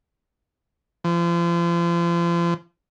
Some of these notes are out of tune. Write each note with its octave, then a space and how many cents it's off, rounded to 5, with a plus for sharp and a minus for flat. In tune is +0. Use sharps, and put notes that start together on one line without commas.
F3 -35